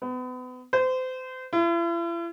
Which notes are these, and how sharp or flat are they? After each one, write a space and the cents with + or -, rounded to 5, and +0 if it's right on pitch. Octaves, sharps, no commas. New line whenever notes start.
B3 +35
C5 -30
E4 +45